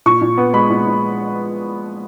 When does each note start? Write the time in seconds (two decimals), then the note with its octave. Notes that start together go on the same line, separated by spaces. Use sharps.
0.06 A#2 C#6
0.21 A#2
0.38 B3
0.53 G#3 B5
0.70 A#2
0.87 A#2